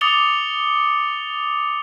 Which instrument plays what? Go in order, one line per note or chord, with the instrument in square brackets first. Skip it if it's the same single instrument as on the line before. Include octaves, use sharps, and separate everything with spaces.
[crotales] D6 D#6 A6 C#7 F7 G7